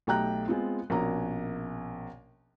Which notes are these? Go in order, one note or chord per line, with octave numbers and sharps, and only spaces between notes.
B1 A3 G4 G5 A#5 F#6
G#3 B3 C4 F4
A#1 B2 A#3 C#4 A#5